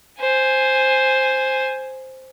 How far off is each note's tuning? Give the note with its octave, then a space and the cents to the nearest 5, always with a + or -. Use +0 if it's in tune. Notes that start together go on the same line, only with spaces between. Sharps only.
C5 +0 G#5 +0